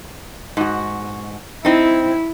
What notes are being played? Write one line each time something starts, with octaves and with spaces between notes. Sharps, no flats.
G#2 F#4
C4 D#4 E4